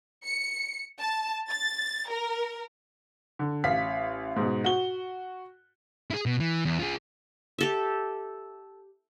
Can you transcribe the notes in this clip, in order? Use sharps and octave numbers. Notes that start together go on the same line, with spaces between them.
C#7
A5
A6
A#4
D3
A1 F5 B6
G#2 B2
F#4 G7
E4 G#4
B2
E3
E2
F4 G#4
G4 A4 E5